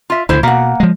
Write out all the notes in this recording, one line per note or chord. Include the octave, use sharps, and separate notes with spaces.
F4 E5
D2 D3 E4 C5
B2 A#3 F#5
F3 G#3